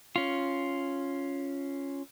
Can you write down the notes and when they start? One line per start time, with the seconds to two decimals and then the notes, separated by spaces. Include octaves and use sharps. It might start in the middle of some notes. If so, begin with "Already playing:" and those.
0.16 C#4 F4